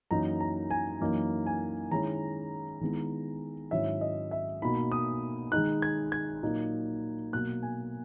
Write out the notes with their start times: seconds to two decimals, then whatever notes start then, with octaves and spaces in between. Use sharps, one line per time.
0.11 F#2 E3 A#3 D#4 A#5
0.40 A#5
0.70 G#5
1.00 F#2 E3 A#3 D#4
1.46 G#5
1.91 D#3 G#3 C#4 E4 A#5
2.81 D#3 G#3 B3 E4
3.71 G#2 D#3 F#3 C#4 E4 E5
4.01 D#5
4.31 E5
4.62 B2 A#3 D#4 B5
4.92 D#6
5.52 D#3 G#3 D#4 F#6
5.82 G#6
6.12 G#6
6.43 A#2 F#3 A#3 D#4
7.32 B2 F#3 A#3 F#6
7.63 G#5